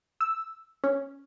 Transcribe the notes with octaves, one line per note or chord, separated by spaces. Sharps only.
E6
C#4